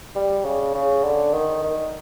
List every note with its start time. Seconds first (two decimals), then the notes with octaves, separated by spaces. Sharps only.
0.16 G3
0.45 C#3
0.74 C#3
1.04 D3
1.34 D#3
1.63 D#3